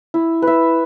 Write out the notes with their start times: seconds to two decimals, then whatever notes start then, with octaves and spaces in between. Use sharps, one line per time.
0.14 E4
0.42 B4 E5